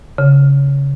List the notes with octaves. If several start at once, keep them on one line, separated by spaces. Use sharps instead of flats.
C#3